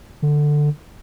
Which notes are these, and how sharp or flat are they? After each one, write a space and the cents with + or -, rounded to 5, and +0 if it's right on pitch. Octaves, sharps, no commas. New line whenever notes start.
D3 +10